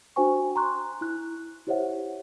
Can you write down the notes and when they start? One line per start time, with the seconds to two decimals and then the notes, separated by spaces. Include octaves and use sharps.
0.16 D4 F#4 C5 G5 G#5 C#6
0.56 A#5 C6 C#6 F#6
1.01 E4 F#6
1.67 E4 G4 C5 C#5 E5 F#5